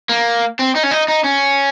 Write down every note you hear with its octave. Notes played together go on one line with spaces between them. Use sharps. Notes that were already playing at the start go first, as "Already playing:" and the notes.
A#3
C4
D#4
C#4
D#4
D#4
C#4